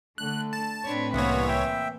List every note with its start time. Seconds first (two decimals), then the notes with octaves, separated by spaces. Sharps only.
0.18 D3 A3 A4 F#6
0.53 A5
0.84 A2 C4 D4 B4 C#5
1.14 C2 E3 A#3 B3 C#5 F#5
1.48 E5 G5